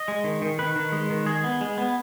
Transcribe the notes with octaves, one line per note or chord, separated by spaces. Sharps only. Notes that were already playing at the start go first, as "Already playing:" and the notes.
Already playing: D#5
G#3
D#3
D#3
D#3 B4
D#3
G#3
D#3
G#3 G#4
B3
G#3
B3